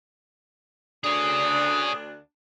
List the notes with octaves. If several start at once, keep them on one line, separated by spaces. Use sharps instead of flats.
D2 D4 G#4 C#5 D#6